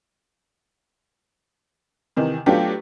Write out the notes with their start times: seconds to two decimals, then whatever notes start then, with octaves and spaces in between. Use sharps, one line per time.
2.16 C3 D#3 E3
2.46 F#3 A3 B3 D4 F4 G4